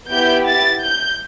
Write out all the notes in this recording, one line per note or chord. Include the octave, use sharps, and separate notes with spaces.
B3 E4 G4 G6
A6
G6